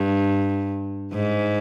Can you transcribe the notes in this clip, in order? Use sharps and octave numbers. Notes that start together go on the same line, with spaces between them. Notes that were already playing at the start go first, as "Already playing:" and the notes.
Already playing: G2
G#2